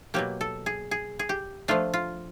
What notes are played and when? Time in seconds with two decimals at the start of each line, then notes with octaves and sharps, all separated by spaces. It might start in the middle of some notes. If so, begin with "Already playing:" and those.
0.14 B2 F#3 A#3 G4
0.41 A4
0.66 G#4
0.91 G#4
1.19 G#4
1.29 G4
1.68 F3 A3 D4 F4
1.93 F4